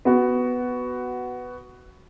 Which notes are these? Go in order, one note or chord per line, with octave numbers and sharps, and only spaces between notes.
B3 F#4